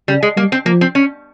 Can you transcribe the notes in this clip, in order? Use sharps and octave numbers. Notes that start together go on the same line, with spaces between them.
C#3 G3
G#3
G3 A#3
C4
F3 A#3
C4
C#4